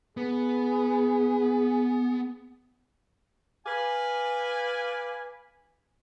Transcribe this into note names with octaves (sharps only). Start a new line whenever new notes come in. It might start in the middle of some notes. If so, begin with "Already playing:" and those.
B3 G#4
B4 D5 F5 G#5